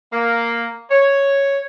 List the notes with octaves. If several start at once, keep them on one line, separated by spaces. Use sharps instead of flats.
A#3
C#5